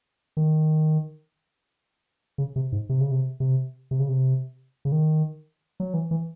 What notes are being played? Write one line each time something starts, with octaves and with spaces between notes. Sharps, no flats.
D#3
C#3
C3
G#2
C3
C#3
C3
C3
C3
C#3
C3
C#3
D#3
F#3
E3
E3